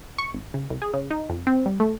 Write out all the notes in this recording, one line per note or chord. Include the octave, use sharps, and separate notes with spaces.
C#6
G#1
C#3
C2
G#4
C#3
D#4
F2
C4
G3
A3